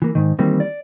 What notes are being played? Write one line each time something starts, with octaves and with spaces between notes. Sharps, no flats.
E3 A#3
G#2 D#3
D#3 E3 G3 A#3 C4
D5